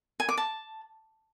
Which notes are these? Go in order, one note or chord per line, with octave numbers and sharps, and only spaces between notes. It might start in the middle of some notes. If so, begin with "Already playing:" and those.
G#5
D6
A5